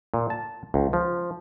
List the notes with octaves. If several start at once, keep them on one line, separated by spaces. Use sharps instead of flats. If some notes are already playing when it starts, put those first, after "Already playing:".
A#2
A5
C#2
F3